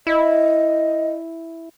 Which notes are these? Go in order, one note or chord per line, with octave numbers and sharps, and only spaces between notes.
E4 D#5